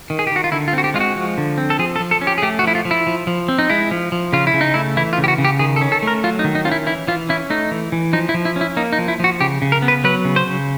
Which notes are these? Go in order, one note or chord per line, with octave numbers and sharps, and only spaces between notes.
D#3
G#4
G4
D#3 F#4
F4
D3 E4
F4
C4 F#4
G4
G#3 F4
F#4
F3
D3
C4
A4
F3 G#4
A4
F3
A4
C#4
G4
G#4
A3 G4
F#4
F3 E4
F4
F3
E4
F3
F3
C4
D#4
G#3 E4
F3
F3
C#3 F4
E4
C#3
D#4
A3 E4
E3 E4
F4
C#3
G4
F#4
C#3
G4
D#3 G#4
A4
C#4
A4
A3 A#4
F#3 F4
D#4
D#3
D#4
C#4 F4
E4
E3 E4
E3 F4
C#4 E4
A3 D#4
E3
E3
F3 D#4
E4
F3
E4
C#4
E4
A#3 D#4
D#4
F3
E4
F3 F#4
C#3 G4
C#3
A#4
B3
B4
F#3 B4
C#3
C5
C#3